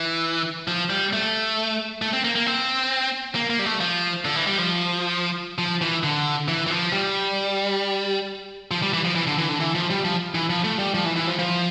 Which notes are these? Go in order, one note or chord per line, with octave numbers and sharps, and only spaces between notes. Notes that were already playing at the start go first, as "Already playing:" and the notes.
Already playing: E3
F3
G3
A3
A3
C4
A#3
A#3
C4
A#3
A#3
G3
A3
F3
D3
E3
G3
F3
F3
E3
D3
E3
E3
F3
G3
F3
G3
E3
F3
E3
D3
E3
D3
E3
F3
G3
F3
E3
F3
A3
G3
F3
E3
E3
F3
F3